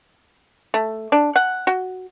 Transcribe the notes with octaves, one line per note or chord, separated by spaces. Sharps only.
A3
D4
F#5
F#4